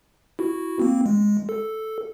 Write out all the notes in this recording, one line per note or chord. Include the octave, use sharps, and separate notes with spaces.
E4 F#4
A#3 C4
G#3
A4